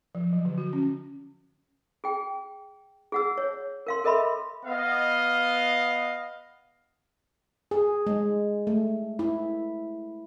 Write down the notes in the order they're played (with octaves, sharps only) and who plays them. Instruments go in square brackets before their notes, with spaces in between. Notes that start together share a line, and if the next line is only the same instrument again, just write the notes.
[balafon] F3
F#3
D3
F#4
C#4
[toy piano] G#4 G5
G#4 F#5 E6
C#5
A#4 F5 C6
A4 A#4 D#5 E5 B5 C6
[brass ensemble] B3 D#5 F5
[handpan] G#4
G#3
A3
E4